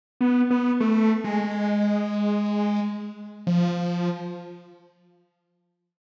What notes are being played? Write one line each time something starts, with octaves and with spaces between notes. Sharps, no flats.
B3
B3
A3
G#3
F3